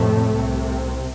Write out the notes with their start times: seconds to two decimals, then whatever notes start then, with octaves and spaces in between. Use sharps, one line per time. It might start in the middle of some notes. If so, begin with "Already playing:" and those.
Already playing: F2 A2 C3 A3
0.30 C2 C3